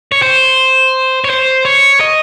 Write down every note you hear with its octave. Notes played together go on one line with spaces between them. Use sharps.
C#5
C5
C#5
C5
C#5
D#5